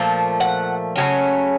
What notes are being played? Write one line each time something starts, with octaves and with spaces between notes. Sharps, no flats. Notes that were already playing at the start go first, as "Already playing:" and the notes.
Already playing: A#2 F3 A3
F#5
C#3 F#3 A3 C#4